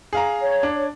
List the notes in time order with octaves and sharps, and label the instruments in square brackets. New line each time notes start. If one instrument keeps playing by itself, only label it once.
[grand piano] G#4 F5 A#5
[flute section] C#5
[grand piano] D4